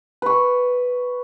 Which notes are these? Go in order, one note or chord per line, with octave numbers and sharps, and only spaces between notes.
B4 C#6